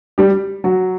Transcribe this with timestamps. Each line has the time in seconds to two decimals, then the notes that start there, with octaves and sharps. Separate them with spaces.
0.18 G3 G4
0.64 F#3 F#4